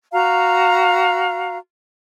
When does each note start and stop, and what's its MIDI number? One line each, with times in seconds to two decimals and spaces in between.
0.12 1.57 66
0.12 1.57 77
0.12 1.57 82